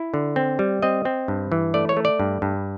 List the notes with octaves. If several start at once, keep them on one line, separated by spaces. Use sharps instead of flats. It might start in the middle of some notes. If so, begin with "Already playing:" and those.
Already playing: E4
D3
C4
G3
C4 D#5
C4
G2
E3
A3 D5
C#5
A3
D5
G2
G2